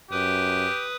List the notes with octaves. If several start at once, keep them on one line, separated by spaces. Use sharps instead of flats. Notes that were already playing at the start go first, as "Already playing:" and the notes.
F#2 G4 B4 D#6